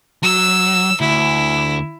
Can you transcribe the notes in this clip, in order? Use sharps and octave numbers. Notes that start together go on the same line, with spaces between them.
F#3 E6
D2 E4